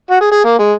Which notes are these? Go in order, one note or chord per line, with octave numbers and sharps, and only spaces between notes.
F#4
G#4
G#4
A#3
G#3